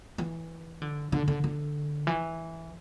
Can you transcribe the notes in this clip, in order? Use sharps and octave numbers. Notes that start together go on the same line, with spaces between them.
E3
D3
D3
D3
D3
E3